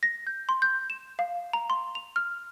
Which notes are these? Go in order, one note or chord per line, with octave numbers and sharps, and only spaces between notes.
A#6
G6
C6
G6
E7
F5
A#5
C6
F7
F6